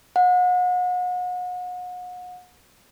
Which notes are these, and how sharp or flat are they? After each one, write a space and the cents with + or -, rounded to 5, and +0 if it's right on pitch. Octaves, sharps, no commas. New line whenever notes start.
F#5 -40